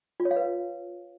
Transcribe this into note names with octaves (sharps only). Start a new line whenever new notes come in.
F4
C#5
F5
B4